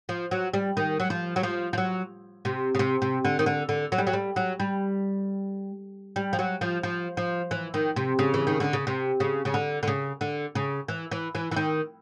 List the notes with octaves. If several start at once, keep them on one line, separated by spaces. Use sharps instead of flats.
F3
F#3
G3
D#3
F#3
F3
F#3
F3
F3
F#3
C3
C#3
C3
C3
D3
D#3
D3
D3
F#3
G3
F#3
G3
F#3
G3
G3
F3
F#3
F3
F3
F3
E3
D#3
C3
C#3
E3
D#3
D3
C#3
C3
C#3
C#3
D3
D3
C#3
D3
C#3
E3
E3
E3
E3
D#3